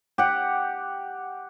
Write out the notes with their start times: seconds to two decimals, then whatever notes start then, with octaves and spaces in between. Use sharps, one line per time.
0.18 G4 F#5